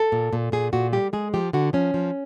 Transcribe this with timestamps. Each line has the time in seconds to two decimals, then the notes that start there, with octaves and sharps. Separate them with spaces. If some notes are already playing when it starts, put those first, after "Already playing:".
Already playing: A4
0.12 A#2
0.33 A#2
0.52 A#2 G#4
0.73 A#2 F#4
0.93 G3 G4
1.13 G#3 G#4
1.34 F3 G4
1.53 D3 F#4
1.73 F3 C#4
1.94 F3